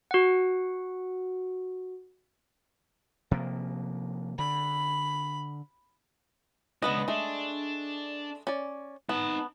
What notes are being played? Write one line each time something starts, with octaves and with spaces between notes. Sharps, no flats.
F#4 F#5
C3 F3 A#3
D3 B5
C#2 B3 D4 B4 D#5
G#3 A3 D4
C#4 D5
B3 D#4 A5